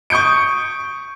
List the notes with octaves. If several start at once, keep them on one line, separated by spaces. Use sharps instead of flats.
C#6 D#6 G6 C#7 D7